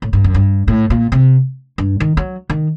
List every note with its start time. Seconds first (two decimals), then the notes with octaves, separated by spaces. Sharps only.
0.02 A2
0.13 G2
0.24 F#2
0.34 G2
0.68 A2
0.90 A#2
1.12 C3
1.78 G2
2.00 D#3
2.17 F#3
2.50 D#3